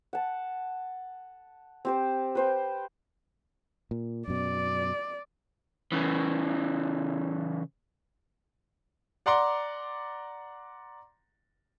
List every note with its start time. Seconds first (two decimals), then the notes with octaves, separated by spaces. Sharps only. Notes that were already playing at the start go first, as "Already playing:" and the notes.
0.13 F#5 A5
1.85 C4 G4 C5
2.35 B4 C5 G5
3.91 A#2
4.28 F#2 B2 D5
5.92 C#3 E3
9.26 D5 F#5 A#5 C6 D6